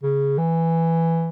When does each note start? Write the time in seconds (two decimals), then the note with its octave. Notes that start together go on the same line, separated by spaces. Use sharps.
0.03 C#3
0.38 E3